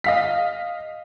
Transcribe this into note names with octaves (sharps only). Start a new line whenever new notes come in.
D#5 F5 B6